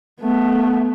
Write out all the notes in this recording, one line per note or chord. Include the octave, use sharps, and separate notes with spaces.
A3 B3